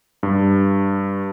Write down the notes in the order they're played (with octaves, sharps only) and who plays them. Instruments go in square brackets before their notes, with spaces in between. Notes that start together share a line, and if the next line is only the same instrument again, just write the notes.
[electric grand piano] G2